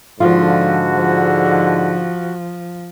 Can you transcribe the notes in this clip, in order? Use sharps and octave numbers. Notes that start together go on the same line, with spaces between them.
G#2 D3 F3 F4 F#4
F3